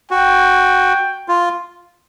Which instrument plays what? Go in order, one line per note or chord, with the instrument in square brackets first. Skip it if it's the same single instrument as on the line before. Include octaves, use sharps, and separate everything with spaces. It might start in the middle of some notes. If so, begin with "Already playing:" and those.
[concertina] F#4 [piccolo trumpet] G5
[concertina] F4